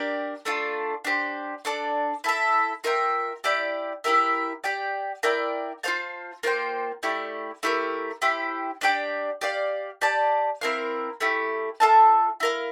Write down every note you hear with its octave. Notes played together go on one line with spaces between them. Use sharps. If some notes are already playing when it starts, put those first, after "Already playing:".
Already playing: D4 G4 A#4 D5
A3 D4 F4
D4 G4 C5
D4 A4 D5
E4 A4 E5
F4 A#4 E5 G5
E4 G4 D5 G5
E4 G4 A#4 E5
G4 D5 G5
E4 A#4 D5 G5
F4 C5 F5 A5
A#3 F4 C5 G5
A3 E4 G4 D5
A3 E4 G4 A#4
E4 G4 C5 G5
D4 G4 D5 G5
G4 D5 F5
G4 D5 A5
C4 E4 A#4 F5
A3 E4 G4
F4 A4 E5 A5
E4 A#4 F5